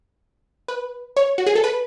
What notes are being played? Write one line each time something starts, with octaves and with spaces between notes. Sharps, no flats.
B4
C#5
F#4
G#4
A4
B4